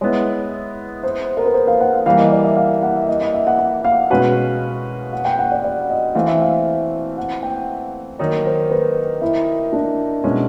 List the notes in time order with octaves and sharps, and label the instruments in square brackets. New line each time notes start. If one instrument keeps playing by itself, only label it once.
[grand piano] G#3 B3 E4 [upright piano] C#5
[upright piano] C5
A#4
B4
C5
F5
F#5
F5
[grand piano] E3 G3 A#3 [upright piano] F5
[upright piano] D#5
D5
E5
F5
F#5
E5
D#5
D#5
E5
F#5
F#5
F5
[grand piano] B2 G#3 C#4 F#4 B4
[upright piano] F#5
G5
F#5
D5
D5
D#5
[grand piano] E3 A3 C4 [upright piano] F5
[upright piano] E5
F5
F#5
G5
[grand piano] D#3 F#3 A#3 D#4 [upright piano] C#5
[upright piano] C5
B4
E4
D4
[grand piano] B2 G#3 C#4